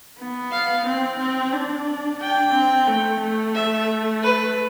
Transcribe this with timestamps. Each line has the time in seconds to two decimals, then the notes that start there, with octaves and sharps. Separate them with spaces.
0.19 B3
0.52 F5
0.86 C4
1.19 C4
1.53 D4
2.20 D4 G5
2.53 C4
2.87 A3
3.21 A3
3.55 E5
4.22 B4